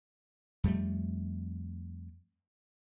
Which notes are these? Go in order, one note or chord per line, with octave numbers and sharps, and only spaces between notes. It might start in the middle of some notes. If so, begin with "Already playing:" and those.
F2 G3 A3